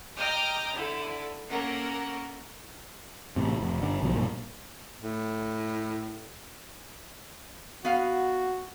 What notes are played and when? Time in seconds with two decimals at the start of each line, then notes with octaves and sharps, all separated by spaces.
0.17 D#5 G5 A#5 D6 D#6 F6
0.75 D3 E4 A4
1.49 A#3 C#4 A4 A#4 F#5
3.36 A1 A2 C3
3.61 F1
3.82 G1 D4
4.03 B1 G#2 B2 F3
4.14 G2 A#2 F3
5.02 A2
7.85 B3 F#4 F5